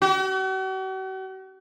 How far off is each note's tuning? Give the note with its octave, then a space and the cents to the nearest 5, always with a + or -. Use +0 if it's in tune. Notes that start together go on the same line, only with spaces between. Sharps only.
F#4 +45